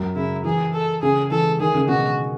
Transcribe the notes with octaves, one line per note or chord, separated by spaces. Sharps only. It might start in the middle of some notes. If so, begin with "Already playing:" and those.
Already playing: F#2
C#3 E4
E3 G#4
A4
C#3 G#4
E3 A4
D#3 G#4
C#3
B2 F#4